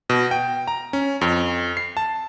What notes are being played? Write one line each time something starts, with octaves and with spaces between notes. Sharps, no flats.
B2
G5
A#5
C#4
F2
C7
A5